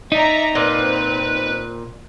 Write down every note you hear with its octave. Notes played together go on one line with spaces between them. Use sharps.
D#4 D5 E5 A#5
A#2 C4 B4